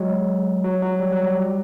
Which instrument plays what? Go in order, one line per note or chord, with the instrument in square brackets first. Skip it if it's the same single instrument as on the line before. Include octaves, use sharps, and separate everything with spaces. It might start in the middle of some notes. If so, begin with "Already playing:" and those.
Already playing: [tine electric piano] F#3 G#3
F#3
F#3
G3
F#3
G3